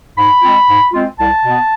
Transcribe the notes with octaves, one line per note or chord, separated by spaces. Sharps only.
G#2 B5
G#3 C4 F4
G#2
G#3 C4 F4
C2 A5
B2 B3